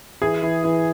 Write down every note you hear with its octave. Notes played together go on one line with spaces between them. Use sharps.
E3 G#4
E3
E3